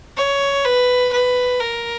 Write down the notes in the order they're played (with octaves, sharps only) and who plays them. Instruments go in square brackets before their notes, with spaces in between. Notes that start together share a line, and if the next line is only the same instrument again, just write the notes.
[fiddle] C#5
B4
B4
A#4